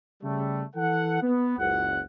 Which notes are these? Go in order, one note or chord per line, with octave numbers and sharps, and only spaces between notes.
C#3 G3 A3
E3 A4 F#5
B3
F#1 C#2 F#5